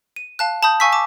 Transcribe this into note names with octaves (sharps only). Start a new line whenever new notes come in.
D#7
F5 A5 F#6
A5 B5 D#6 G6
F5 G#5 C#6 E6 B6
A5 D6